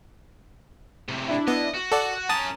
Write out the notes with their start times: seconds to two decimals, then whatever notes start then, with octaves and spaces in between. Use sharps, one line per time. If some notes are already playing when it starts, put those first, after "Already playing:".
1.09 A2 C3
1.28 D4 E4
1.48 B3 D#5
1.74 F#4
1.92 A4 D5 F#5
2.29 C#4 A#4 A5 D#6 A6